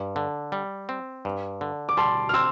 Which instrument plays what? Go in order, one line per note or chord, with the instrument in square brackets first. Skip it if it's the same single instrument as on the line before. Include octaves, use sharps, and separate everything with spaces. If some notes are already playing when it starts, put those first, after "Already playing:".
Already playing: [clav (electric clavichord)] G2
D3
G3
C4
G2
D3
[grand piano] D6
[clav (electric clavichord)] G3 [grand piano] A5 C6
[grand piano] F6
[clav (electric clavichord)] C4 [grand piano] C6 E6